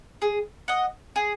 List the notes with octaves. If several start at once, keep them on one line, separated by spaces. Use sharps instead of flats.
G#4
D#5 F#5
G#4